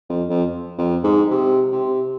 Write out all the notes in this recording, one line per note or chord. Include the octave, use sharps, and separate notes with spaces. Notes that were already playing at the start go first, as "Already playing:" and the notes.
F2
F2
F2
G#2
C3
C3